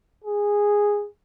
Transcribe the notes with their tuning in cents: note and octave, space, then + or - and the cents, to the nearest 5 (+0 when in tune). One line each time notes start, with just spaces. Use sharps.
G#4 -10